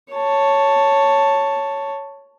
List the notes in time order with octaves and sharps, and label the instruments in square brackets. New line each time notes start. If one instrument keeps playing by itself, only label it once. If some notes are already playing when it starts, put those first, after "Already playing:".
[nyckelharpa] C#5 A5